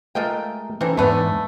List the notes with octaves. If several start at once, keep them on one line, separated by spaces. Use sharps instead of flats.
G#3 A3 F4 A#4 D#5 G5
E3 C4 C#4 D#4 A4
E2 G#2 A3 D4 B4 C#5